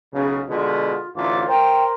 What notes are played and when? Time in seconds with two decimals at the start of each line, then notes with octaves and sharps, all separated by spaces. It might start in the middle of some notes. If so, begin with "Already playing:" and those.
0.12 B1 C#3
0.47 B2 D3 G#3 F4
1.15 A1 D2 F4 D6
1.47 A#4 C5 G5